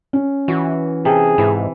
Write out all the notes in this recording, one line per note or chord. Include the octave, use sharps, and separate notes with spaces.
C#4
E3 F#4
C3 G#4 A4
G#2 E3